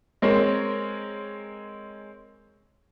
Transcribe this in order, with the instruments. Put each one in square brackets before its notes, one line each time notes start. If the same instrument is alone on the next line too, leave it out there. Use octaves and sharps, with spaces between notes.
[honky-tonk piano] G#3 C4 A#4 C#5